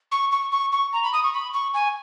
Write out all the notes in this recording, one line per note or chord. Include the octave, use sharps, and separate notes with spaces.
C#6
C#6
C#6
C#6
A#5
B5
D#6
C#6
B5
C#6
G#5